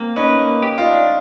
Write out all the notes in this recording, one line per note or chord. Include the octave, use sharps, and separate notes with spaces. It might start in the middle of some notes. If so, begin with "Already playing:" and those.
Already playing: A#3 C4
C#4 D#4 B4
A#3
G4
D#4 F4
D4